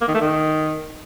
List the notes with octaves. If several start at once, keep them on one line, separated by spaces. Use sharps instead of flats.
A#3
D#3
A3
D#3